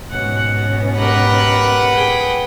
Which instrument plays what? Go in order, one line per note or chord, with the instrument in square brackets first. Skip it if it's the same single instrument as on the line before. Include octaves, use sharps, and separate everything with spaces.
[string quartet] G#2 B2 C#4 [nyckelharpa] F#5
[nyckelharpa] G4 A#4 [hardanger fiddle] B4 F#5
[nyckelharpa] G#4 G5